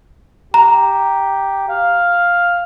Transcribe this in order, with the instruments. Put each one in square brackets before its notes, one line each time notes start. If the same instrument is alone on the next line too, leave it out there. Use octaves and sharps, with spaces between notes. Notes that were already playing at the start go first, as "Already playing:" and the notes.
[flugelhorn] G4 [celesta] A#5
[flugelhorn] F5